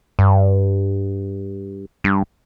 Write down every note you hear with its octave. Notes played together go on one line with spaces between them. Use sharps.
G2
G2